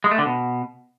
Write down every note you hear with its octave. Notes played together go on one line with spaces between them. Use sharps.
G#3
A3
D3
B2